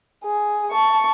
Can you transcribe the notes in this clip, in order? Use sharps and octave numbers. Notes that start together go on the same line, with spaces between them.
G#4
A5 C#6